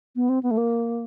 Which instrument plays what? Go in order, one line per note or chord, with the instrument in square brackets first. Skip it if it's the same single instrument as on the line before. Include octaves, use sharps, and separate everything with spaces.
[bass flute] B3
C4
B3
A3
A#3